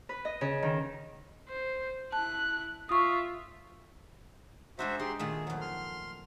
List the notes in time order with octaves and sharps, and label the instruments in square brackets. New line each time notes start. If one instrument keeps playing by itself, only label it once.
[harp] B4
D#5
C#3
D#3
[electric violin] C5
[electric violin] E4 F#6 [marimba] A5
[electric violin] F4 E5 [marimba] C#6 D#6
[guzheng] G#3 D4 D#4 [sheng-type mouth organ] F#4 C5 E5
[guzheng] D#4 [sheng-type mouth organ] G4 G#4 C6
[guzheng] A#2 D#3 A3 [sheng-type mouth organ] G#4
[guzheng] F2 F#3
[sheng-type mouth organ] C6 F6